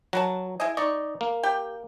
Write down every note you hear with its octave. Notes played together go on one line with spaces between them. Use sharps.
F#3 F#4 A#4 A5
E4 G#4 D#5
D#4 D5 D#5 C#6
A#3
G4 G5